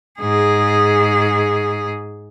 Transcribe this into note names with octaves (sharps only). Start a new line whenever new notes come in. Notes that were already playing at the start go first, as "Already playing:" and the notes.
G#2 G#4